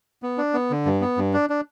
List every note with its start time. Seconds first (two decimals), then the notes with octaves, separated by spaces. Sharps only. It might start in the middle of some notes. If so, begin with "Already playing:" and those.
0.23 B3
0.38 D4
0.53 B3
0.70 D3
0.86 G2
1.01 B3
1.18 G2
1.33 D4
1.50 D4